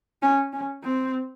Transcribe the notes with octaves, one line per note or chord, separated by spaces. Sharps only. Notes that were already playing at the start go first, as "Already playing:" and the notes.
C#4
C#4
C4